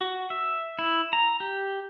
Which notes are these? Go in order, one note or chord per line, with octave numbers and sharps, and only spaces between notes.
F#4
E5
E4
A#5
G4